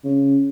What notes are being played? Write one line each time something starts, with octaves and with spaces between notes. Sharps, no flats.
C#3